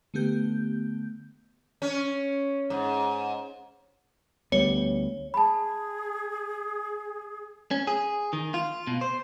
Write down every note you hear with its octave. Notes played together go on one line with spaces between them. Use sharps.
D3 A3 B3 G4 G6
C#4
G#2
D2 G3 B3 C#5
G#4 A5 B5
C#4
G#4
D#3
F4
B2
C5